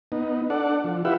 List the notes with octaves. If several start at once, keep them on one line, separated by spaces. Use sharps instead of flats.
B3 D#4
D4 A4 D5 F#5
F3
E4 F4 G4 B4 E5 F#5